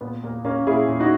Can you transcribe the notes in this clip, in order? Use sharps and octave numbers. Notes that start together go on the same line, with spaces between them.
A#2 B3
A#2 A#3
A#2 A#3 C#4
A#2 E4 G#4
A#2
D#4 F#4